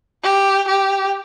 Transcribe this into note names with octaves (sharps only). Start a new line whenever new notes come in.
G4
G4